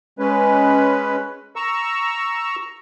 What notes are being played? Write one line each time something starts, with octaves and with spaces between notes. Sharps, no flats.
G#3 C#4 B4
A#5 C#6 E6